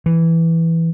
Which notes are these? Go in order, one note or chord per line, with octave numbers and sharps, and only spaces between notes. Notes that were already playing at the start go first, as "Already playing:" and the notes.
E3